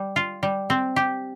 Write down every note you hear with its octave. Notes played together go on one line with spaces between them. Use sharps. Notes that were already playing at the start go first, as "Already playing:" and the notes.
Already playing: G3
F4
G3
C4
G4